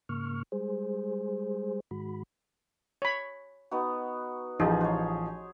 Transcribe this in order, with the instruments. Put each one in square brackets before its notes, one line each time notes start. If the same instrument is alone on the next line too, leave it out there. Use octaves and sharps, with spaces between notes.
[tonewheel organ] G#2 C#3 A#3 C#6 F6
G3 G#3 G#4 C5
G#2 D#3 G#3 F#4 B5
[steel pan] C#5 B5
[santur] B3 D#4 F#4
[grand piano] A1 F3 [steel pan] D#4 G4 [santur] G#4
[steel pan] D#4 [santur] C5 C#5